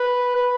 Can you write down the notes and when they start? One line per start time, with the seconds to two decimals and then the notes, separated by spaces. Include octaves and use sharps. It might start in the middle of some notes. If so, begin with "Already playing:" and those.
Already playing: B4
0.35 B4